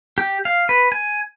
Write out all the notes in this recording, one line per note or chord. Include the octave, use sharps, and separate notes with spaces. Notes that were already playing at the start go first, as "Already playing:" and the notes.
G4
F5
B4
G#5